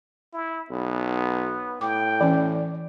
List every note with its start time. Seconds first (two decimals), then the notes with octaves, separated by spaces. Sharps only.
0.33 E4
0.70 B1 B3
1.81 A2 G5 D6
2.21 E3 C#4 D5